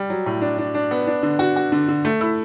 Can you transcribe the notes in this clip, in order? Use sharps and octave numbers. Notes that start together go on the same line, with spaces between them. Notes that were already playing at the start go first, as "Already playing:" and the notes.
Already playing: G3
F#3
A2
D4
D4
D4
B3
D4
D3
F#4
F#4
D3
D3
A3
E4